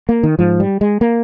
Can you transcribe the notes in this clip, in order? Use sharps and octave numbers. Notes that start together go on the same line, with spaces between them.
A#3
D#3
G#2 F3
G3
G#3
A#3